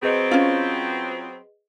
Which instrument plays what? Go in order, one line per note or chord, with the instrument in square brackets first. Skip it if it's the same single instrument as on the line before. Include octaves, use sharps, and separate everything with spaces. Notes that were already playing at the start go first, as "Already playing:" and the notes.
[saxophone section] F#3 B3 C4 [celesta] G#4 B4 D#5
[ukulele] C#4 F4